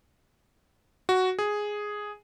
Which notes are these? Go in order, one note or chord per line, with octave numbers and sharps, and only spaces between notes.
F#4
G#4